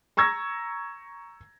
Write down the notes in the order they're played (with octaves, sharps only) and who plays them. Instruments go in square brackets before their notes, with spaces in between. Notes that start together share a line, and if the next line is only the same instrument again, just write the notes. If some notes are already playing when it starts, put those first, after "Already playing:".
[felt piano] A#5 C#6 E6 G#6 A#6